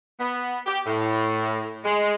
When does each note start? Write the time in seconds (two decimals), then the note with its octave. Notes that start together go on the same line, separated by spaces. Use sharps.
0.19 B3
0.66 G4
0.86 A2
1.84 G#3